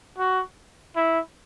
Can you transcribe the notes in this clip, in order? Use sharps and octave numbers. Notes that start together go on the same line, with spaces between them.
F#4
E4